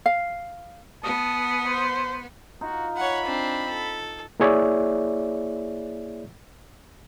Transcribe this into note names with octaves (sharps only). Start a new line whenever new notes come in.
F5
B3 A5 D#6
C5
D#4 F4 F#4
C#5 F#5 B5
C4 D4
A4
A#3 E4 G#4 C#5 D5 E5